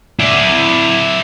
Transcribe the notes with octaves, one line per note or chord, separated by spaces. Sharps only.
E4 D5